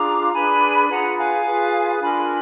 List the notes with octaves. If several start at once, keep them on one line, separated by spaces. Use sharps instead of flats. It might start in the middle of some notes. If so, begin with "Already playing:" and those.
Already playing: D4 F4 G#4 A#5 D6
D4 G#4 B4 G#5 B5
F4 G#4 B4 F#5 A#5
F5 G#5
F4 G#4 B4
D4 F4 A#4 G#5 B5